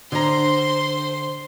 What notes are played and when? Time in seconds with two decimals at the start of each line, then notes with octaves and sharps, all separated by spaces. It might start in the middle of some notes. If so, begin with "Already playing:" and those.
0.12 D3 C5 A#5 C6